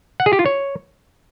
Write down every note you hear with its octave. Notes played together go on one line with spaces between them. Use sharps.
F#5
G#4
G4
F4
C#5